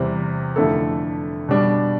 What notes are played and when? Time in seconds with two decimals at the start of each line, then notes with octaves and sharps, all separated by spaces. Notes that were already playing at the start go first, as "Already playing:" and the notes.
Already playing: E2 C3 G3 C4 E4
0.56 F2 D3 A3 E4 A4
1.49 B2 G3 D4